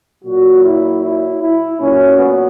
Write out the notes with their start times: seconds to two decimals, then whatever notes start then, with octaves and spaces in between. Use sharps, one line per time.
0.24 A#2 F#3 F#4
0.62 E4
1.02 E4
1.40 E4
1.79 A#2 F#3 C#4
2.18 B3